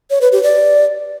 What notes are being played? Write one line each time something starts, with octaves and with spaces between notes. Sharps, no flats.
C#5
B4
G4
D5